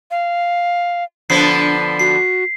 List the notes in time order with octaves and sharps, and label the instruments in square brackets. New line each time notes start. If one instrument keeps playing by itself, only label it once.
[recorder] F5
[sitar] D3 F3 B3 [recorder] D4 [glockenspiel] B6 C7
[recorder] F#4 [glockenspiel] C7